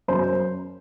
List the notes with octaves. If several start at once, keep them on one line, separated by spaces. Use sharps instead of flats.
F#2 C5